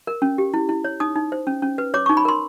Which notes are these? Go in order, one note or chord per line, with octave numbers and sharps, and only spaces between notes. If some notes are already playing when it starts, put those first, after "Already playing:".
A#4
C#4
G4
E4
E4
C#5
D#4 D#6
D#4
C5
C#4
C#4
B4
C#5 D6
C#6
D#4
B5
A#4 C6